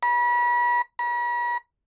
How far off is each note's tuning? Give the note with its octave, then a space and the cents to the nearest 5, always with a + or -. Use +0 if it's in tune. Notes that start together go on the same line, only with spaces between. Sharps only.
B5 -35
B5 -45